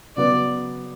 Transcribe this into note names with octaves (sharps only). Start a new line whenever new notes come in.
C#3 F#3 B3 D5